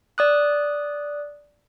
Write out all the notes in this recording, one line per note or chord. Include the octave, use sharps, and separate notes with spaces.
D5 D#6 F#6